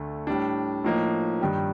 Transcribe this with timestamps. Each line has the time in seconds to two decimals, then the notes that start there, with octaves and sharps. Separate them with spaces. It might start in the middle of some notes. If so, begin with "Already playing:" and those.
Already playing: D2 D3 A3
0.27 A2 G3 D4
0.84 A2 F3 A#3 D#4
1.41 G2 D#3 G3